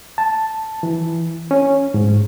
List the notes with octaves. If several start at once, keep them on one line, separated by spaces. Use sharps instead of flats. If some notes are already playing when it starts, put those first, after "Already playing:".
A5
E3
C#4
G#2